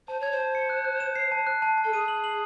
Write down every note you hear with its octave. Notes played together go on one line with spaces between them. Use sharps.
C5 A5
C#5 G#6
C5
A5
C#7
F#6
F#6
E7
C7
A5
F#6
A5
A5
A4
G#4 D#7
F#7
F#7